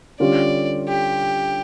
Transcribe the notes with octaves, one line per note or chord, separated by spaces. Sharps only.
D3 G3 C#4 F4 D5
G4